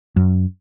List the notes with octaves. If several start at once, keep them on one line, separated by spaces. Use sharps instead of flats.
F#2